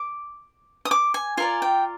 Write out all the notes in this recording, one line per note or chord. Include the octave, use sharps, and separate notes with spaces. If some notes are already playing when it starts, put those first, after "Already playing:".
Already playing: D6
D#6
D6
G#5
F4 A#4 D5 G#5
G5